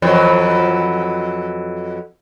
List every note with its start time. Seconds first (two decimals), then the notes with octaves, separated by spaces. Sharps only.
0.02 F2 E3 F#3